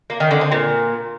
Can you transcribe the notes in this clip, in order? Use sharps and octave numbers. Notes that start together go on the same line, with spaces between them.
A#3
D#3
D3
C4
A#2